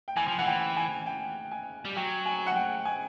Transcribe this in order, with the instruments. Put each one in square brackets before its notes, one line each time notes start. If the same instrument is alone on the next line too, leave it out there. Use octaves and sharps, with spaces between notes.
[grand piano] G5
[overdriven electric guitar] E3 [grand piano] G#5
[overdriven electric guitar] F3
[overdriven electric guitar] E3 [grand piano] F#5
[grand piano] G5
G#5
G5
G#5
[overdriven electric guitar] G3
[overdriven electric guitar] F#3 [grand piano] G5
[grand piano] G#5
F#5
G5
G#5